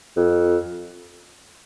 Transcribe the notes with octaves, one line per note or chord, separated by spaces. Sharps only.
F2